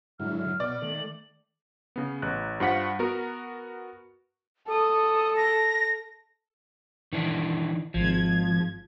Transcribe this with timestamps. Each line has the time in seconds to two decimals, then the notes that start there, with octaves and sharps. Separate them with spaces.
0.20 G#2 D3 F#3 E4 F6
0.60 B2 B3 D5
0.82 D#3 A3 F#7
1.96 C#3 B3
2.22 A1 F#6
2.60 G2 F4 C5 F#5 C#6 B6
2.99 B3 F#4 A#4
4.69 A4 D#6
5.37 A#6
7.13 D#3 E3 D4
7.94 G#1 F3 G#6